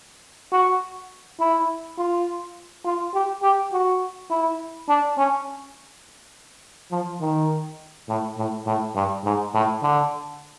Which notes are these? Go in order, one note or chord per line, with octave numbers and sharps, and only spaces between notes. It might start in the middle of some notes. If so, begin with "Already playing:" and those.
F#4
E4
F4
F4
G4
G4
F#4
E4
D4
C#4
F3
D#3
A2
A2
A2
G2
G#2
A2
D3